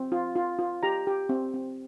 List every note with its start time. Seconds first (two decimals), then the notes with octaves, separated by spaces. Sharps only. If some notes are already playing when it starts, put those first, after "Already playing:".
Already playing: C4
0.12 F4
0.36 F4
0.59 F4
0.83 G4 A#5
1.07 G4
1.29 C4
1.54 C4